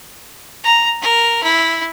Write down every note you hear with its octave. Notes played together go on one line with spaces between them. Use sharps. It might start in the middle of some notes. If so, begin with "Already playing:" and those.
A#5
A#4
E4